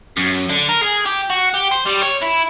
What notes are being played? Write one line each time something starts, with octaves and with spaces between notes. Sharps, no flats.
F#2
D3
A#4
G#4
G4
F#4
G4
C5
G3
C#5
E4